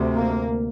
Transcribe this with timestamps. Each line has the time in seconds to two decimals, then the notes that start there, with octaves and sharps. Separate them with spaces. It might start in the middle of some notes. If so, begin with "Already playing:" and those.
Already playing: D2 C3
0.14 A#3